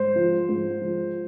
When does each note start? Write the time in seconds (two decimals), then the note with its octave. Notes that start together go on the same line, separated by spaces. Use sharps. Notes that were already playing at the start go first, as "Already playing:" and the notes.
Already playing: G#2 C5
0.15 F3
0.49 G#2
0.82 F3